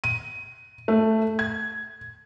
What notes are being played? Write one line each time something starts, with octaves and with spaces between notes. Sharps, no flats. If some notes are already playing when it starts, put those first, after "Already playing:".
D#7
A3
G#6